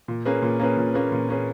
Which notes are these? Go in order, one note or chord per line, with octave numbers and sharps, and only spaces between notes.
A#2
A#3 C#4 G#4 B4
A#2
A#3 C#4 G#4 B4
A#2
A#3 C#4 G#4 B4
A#2
A#3 C#4 G#4 B4